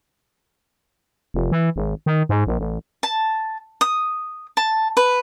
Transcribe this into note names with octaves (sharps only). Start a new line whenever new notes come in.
F1
E3
G#1
D#3
G#2
A#1
A1
A5
D#6
A5
B4